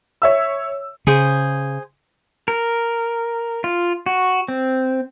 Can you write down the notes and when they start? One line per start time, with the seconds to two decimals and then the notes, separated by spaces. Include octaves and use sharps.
0.22 C#5 E5 E6
1.07 C#3 G#4 C5
2.48 A#4
3.64 F4
4.06 F#4
4.48 C4